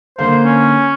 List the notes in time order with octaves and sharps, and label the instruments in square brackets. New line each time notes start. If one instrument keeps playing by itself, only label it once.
[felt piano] D3 A#3 [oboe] C5
[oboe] C#4